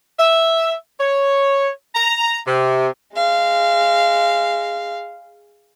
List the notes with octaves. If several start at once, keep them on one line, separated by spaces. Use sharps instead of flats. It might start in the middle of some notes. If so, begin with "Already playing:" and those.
E5
C#5
A#5
C3
G#3 F5